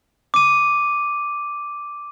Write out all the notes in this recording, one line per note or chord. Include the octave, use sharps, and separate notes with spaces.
D6 D#7